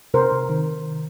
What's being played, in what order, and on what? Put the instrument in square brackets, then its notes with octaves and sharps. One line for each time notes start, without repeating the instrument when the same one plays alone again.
[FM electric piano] C3 [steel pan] A#4 C5
[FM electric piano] C3
D#3